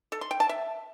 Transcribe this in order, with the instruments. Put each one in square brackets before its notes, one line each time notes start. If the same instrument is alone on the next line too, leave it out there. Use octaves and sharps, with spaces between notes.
[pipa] A4
C6
G5
A5
E5